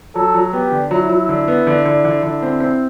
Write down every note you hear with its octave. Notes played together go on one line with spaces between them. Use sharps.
F#3 A4
F#3
B3 G4
D3
F#3 E4
F#3
D3
B3
D3
D3
D3
D3
C4
C4